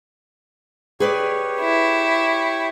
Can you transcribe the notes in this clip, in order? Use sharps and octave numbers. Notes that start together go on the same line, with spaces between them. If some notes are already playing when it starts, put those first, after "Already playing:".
G4 G#4 B4 C#5 D5
E4